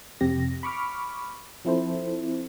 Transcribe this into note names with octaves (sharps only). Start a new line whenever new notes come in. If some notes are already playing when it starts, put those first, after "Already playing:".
F2 C3 G4 A#6
B5 C#6 D6 F6
F3 C4 E4 A4 C5